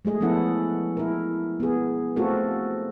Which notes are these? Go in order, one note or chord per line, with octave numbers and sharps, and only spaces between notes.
G#3 A3 G#4 D#5
F3 B3 C#4 E4 A4 F#5
E4 A#4
B3 G#4
A3 C4 F4 F#4 A4 A#4